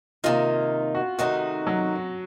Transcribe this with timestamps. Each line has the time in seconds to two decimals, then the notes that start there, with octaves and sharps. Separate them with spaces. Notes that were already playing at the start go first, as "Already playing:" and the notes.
0.24 C3 D#3 A#3 D#4 F4
0.95 F#4
1.19 C3 D#3 A3 D#4 F#4
1.67 F#3